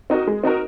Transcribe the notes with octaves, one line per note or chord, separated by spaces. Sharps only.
C4 D#4 F#4 A#4
G#3
C4 D#4 F#4 A#4